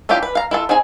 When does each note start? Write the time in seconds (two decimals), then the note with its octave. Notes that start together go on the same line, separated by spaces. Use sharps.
0.09 C#4 D4 E4 F4 G4
0.23 B4
0.35 F5 A#5
0.51 E4 F4 A4
0.69 C4 D#4 G#4 G#5